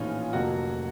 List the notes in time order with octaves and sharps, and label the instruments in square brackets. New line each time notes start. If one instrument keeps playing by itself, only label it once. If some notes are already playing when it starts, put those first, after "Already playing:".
Already playing: [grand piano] A#1 A2 E3 [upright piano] C#4 D#4 F4
[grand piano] F1 F2 D3 F#3 A#3 [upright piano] F#4